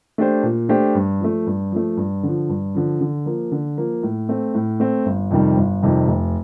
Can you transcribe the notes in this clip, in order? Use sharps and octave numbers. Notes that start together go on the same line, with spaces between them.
A3 D4 G4 C5
A#2
A3 D4 G4 C5
G2
F3 A3
G2
F3 A3
G2
D3 F3
G2
D3 F3
D3
F3 A#3
D3
F3 A#3
A2
A3 C4
A2
A3 C4
G1
F2 C3 D#3 G3
G1
F2 C3 D#3 G3
F1